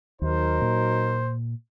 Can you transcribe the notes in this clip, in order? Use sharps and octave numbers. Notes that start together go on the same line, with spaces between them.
D#2 F#3 D#4 A#4 C5
A#2